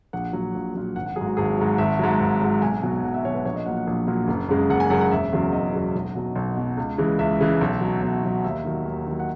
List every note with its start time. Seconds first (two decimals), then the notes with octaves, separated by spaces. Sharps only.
0.13 A#1 F#5
0.33 A#2 F#3
0.55 A#1
0.74 A#2 F#3
0.96 G#1 F#5
1.06 F#5
1.16 G#2 F#3 G#4
1.26 F#4
1.37 G#1 G#4
1.58 G#2 F#3
1.78 G#1 E5
1.99 G#2 F#3
2.20 G#1
2.41 G#2 F#3
2.62 B1 G#5
2.83 B2 F#3
3.03 B1 F#5
3.14 E5
3.25 B2 F#3 C#5
3.34 B4
3.45 A#1 C#5
3.56 D#5
3.66 A#2 F#3 F#5
3.77 F#5
3.87 A#1
4.07 A#2 F#3
4.28 F#1
4.49 F#2 C#3 G#3
4.69 F#1 F#5
4.80 G#5
4.90 F#2 C#3 G#3 F#5
5.01 F#5
5.11 E1 E5
5.32 E2 C#3 F#3
5.52 E1 D#5
5.74 E2 C#3 F#3
5.95 B1
6.15 B2 F#3
6.35 B1
6.56 B2 F#3
6.77 C#2
6.98 C#3 E3 G#3
7.19 C#2 E5
7.41 C#3 E3 G#3
7.61 B1
7.81 B2 F#3
8.03 B1
8.23 B2 F#3
8.44 D#2 E5
8.64 D#3 F#3
8.85 D#2
9.06 D#3 F#3
9.20 F#5